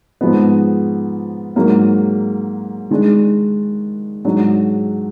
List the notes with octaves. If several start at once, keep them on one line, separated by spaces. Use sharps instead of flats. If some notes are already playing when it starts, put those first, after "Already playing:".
G#2 F3 B3
G#2 F#3 A#3
D#3 G#3 D4
G#2 F#3 D4